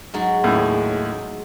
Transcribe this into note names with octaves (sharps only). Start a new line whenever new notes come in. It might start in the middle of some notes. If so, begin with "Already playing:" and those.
G#2 F#3 G#3
D#2 A2 C#3